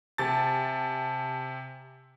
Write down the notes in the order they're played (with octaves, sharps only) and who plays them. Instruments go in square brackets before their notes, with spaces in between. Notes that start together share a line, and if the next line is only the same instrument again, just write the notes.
[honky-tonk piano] C3 A6 [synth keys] G#5 A5